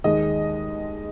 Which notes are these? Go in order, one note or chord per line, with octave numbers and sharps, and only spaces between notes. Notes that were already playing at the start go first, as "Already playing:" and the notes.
D#2 D#3 G#3 D#5